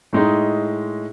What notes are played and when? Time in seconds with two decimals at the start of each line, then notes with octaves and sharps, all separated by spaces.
0.13 A2 G#3 D#4